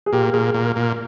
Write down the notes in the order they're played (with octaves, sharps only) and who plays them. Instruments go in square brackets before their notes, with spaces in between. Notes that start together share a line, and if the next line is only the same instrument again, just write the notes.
[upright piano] G#4
[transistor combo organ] A#2 [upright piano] G4
[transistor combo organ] A#2 [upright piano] G#4
[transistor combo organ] A#2
A#2